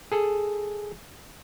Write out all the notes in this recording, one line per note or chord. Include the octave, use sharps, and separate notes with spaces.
G#4 A4